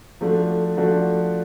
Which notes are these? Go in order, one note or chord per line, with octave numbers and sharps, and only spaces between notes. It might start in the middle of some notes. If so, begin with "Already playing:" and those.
F3 A3 D4 F#4
F3 A3 D4 F#4